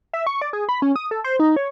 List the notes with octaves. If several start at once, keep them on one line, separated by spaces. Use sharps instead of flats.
E5
C#6
D5
G#4
B5
C#4
D#6
A4
C5
D#4
C#5